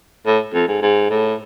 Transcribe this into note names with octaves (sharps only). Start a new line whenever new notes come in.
A2
F2
G#2
G#2
A2